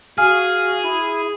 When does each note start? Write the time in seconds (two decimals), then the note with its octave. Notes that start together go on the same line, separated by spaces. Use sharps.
0.18 F#4 G#4 F5 G#5 F6
0.84 E4